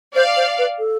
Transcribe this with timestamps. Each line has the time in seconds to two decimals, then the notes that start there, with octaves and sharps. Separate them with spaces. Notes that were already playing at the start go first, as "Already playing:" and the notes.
0.15 C5 D5 F5
0.37 C5
0.59 B4
0.79 A4